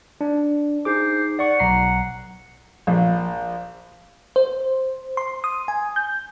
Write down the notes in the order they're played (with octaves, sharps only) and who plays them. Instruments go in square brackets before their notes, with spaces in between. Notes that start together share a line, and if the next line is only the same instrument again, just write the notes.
[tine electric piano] D4
[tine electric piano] D#4 G#4 D6 [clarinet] C5
[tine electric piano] D5 C#6 [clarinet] F#5
[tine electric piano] B1 A#5 C7
[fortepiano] A#1
[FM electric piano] C5
C6
D#6
G#5
G6